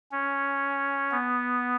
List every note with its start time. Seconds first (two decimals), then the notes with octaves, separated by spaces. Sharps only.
0.12 C#4
1.12 B3